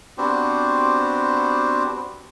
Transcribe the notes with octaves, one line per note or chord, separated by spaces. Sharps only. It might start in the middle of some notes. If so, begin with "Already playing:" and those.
B3 C4 D4 F#4 G4 C5